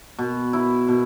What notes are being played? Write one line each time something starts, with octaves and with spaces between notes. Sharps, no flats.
B2
E4
B2